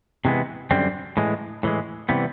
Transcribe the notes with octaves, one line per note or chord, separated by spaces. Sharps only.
C3 E3 G#3 B3
F#2 D3 G3 C4
A2 E3 G#3
A2 E3 G#3
C3 E3 G3 B3